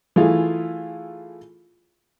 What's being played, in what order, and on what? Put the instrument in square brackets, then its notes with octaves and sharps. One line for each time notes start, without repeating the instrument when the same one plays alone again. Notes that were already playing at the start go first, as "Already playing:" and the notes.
[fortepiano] E3 A3 F4 G#4